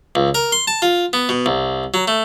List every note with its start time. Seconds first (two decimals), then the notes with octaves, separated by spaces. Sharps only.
0.15 C#2
0.35 A#4
0.52 C6
0.67 A5
0.82 F4
1.13 B3
1.29 B2
1.46 C2
1.94 F#3
2.08 A3